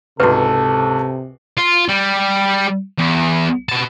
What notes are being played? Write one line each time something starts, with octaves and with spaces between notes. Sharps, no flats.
C#2 G#2 C3 F#4 A4 B4
F4
G3
E2
B2 A5